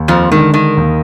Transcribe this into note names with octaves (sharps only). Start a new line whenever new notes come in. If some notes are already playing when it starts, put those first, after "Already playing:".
Already playing: D#2
F2 F3
D3 D#3 G#3
D#3
D#2